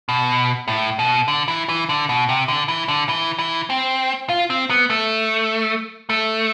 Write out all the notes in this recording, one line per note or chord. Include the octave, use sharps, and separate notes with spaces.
B2
A2
B2
D3
E3
E3
D3
B2
C3
D3
E3
D3
E3
E3
C4
F4
C4
B3
A3
A3